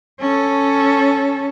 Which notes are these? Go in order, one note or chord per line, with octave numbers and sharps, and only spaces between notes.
C#4 A4